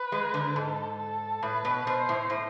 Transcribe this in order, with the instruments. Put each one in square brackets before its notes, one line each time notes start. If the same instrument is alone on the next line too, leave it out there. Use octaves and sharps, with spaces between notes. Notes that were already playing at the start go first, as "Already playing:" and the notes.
Already playing: [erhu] B4
[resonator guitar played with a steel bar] G#3
D3
[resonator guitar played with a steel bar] G#2 [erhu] A4
[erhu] A4
[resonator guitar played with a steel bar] A2 [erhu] B4
[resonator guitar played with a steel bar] B2
[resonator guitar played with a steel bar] B2 [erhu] C5
[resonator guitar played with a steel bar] A2
A2